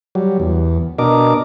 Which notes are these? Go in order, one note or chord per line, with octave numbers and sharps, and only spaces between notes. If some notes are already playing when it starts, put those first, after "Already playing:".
F#3 G3
E2
B2 D4 A#4 D#5 D6